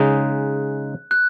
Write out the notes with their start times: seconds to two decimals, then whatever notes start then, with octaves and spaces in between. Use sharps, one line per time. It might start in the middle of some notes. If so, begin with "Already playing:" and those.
Already playing: C#3 G#3 D#4 F#6
1.11 F#6